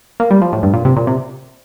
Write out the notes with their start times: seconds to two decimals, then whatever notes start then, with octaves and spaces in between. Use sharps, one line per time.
0.20 A#3
0.31 G3
0.42 F3
0.53 A2
0.63 G2
0.74 A#2
0.85 C3
0.96 A#2
1.07 C3